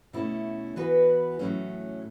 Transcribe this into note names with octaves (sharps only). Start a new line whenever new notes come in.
B2 A3 C#4 E4
E3 B3 F#4 B4
A2 F#3 A3 C#4